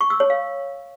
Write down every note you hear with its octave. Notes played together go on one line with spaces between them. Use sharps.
C#6
E6
C#5
F5